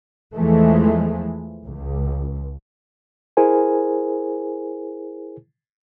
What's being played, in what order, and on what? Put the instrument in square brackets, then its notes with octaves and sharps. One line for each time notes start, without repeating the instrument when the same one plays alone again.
[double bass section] E2 E3 F3 G#3 A3
C#2
[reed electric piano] E4 G#4 A#4 C5 G#5